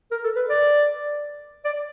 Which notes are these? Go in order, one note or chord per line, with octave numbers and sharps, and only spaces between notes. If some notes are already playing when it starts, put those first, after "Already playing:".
A#4
A4
B4
D5
D5